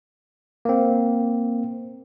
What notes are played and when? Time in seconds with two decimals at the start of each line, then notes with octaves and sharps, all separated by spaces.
0.65 A#3 C4